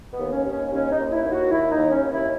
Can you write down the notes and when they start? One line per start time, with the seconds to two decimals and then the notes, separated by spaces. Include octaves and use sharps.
0.12 B3
0.19 D#2
0.33 C#4
0.46 D#2
0.52 C#4
0.72 D#2 C#4
0.92 D#4
0.99 D#2
1.07 D#4
1.12 E4
1.25 D#2
1.32 F#4
1.51 D#2 E4
1.71 D#4
1.78 D#2
1.91 C#4
2.04 D#2
2.11 E4